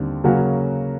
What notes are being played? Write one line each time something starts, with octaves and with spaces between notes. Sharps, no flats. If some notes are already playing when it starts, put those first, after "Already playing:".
Already playing: D#2 D3 G3 C4
C#3 F#3 A#3 C#4 F#4